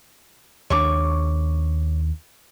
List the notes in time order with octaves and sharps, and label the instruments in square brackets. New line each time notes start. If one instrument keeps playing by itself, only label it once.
[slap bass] D#2 D4 [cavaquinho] C#5 C#6 D6